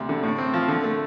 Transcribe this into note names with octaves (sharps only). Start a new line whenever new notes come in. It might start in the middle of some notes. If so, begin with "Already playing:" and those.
Already playing: D2 C3
D3
A2
C4
F3
D3
A3